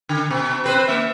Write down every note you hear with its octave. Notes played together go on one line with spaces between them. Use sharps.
D3
B2
C4 B4 C5
A#3 E5